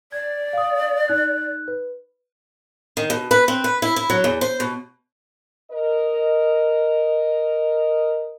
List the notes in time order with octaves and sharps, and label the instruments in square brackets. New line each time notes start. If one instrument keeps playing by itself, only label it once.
[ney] D5 [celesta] G#6
[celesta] F5 D#6
D#4 F#6
B4
[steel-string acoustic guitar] D#3
B2
B4
C4
B4
E4
E4
F#3
E2
C5
B2
[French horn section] A#4 D#5